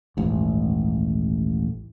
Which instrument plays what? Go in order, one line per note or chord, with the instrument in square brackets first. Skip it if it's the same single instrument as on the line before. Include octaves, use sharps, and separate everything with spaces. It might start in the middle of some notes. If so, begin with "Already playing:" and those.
[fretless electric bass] D#1 A1 G#2